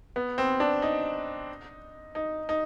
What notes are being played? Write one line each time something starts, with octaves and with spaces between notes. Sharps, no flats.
B3
C4
D4
D#4
D#4
D#4